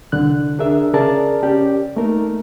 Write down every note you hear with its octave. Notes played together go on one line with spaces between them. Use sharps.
C2 D3 F#6
D4 G#4 A#4 E5
C#3 G#4 A#4 D5 A5
C#4 G4 D5
A3 A#3 D#4 A#4